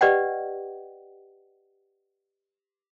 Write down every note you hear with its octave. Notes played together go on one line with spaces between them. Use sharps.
G4 B4 D5 D#5 F#5 G5